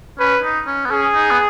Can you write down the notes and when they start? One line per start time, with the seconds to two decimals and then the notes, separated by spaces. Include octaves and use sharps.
0.19 C#4 B4
0.43 D#4
0.67 C#4
0.86 B3
0.91 C#4 G#4
1.15 D#4
1.31 B3